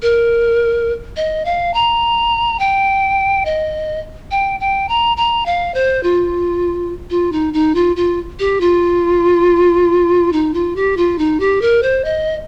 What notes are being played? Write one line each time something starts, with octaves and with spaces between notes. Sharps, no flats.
A#4
D#5
F5
A#5
G5
D#5
G5
G5
A#5
A#5
F5
C5
F4
F4
D#4
D#4
F4
F4
G4
F4
D#4
F4
G4
F4
D#4
G4
A#4
C5
D#5